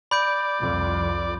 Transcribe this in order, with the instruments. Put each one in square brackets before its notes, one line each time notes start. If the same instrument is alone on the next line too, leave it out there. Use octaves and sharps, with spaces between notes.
[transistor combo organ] D5 [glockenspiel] B5 G6 D7
[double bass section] C2 F2